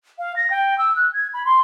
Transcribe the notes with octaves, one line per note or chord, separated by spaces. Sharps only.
F5
A#6
G5
E6
F#6
G#6
B5
C6